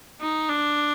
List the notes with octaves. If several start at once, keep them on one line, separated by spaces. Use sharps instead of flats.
D#4
D4